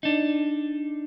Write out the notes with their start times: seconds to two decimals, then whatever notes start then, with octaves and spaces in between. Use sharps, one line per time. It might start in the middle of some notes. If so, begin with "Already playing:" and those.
0.03 D4 D#4